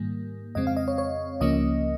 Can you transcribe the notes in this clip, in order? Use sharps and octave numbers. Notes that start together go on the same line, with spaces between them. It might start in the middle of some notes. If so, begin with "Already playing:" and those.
Already playing: G#2 D#3 G3 A#3
F2 C#3 G#3 C4 D#5
F5
D#5
C#5
C#5
C#2 C#3 F3 A#3 C#4 D#5